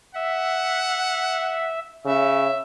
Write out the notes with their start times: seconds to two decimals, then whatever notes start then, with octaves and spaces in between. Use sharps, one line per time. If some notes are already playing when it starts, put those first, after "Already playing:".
0.15 E5 F#5
2.05 C#3 E5